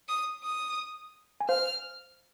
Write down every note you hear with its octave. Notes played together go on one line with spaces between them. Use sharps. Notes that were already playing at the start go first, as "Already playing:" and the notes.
D#6
D#6
G#5
C5 F5 F6